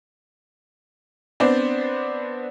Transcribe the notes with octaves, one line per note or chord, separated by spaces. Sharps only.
B3 C4 D4 C5 D5